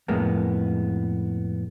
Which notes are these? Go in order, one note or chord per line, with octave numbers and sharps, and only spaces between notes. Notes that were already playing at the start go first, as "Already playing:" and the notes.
F2 A2 G#3 A#3 B3